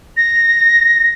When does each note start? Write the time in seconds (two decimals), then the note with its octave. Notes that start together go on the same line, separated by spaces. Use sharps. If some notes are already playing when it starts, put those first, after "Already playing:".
0.17 A#6